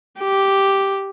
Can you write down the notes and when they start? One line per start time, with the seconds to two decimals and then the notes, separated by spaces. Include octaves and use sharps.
0.20 G4